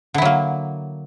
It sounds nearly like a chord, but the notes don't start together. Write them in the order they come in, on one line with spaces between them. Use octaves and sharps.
D3 E4 F#3 A#3